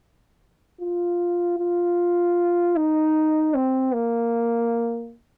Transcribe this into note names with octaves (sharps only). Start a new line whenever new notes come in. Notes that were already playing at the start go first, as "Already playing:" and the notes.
F4
F4
D#4
C4
A#3